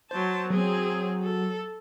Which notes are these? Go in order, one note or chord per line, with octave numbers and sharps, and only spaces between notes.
F#3 C5 A5
F#3 C4 G#4
A4